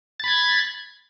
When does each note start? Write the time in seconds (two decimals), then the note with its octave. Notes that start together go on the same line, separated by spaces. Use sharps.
0.20 A6
0.24 B5
0.28 G#6